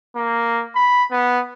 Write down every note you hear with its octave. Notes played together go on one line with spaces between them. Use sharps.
A#3
B5
B3